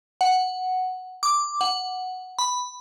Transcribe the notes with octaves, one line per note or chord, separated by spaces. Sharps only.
F#5
D6
F#5
B5